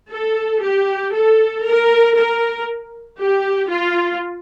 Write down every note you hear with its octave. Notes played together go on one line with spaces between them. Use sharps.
A4
G4
A4
A#4
A#4
G4
F4